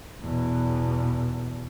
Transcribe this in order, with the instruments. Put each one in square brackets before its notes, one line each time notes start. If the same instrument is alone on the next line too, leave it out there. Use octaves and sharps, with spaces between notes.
[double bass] E2 B2